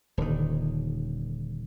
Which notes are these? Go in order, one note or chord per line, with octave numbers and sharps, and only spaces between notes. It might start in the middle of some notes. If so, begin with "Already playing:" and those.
D#1 D3 D#3